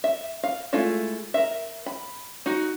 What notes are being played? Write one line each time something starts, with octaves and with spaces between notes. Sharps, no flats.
E5
F5
G#3 A3 E4 F4
A#4 E5
B5
D#4 F#4